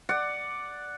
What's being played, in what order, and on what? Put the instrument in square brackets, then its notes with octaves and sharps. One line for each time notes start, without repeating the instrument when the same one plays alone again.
[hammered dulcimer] D5 F#5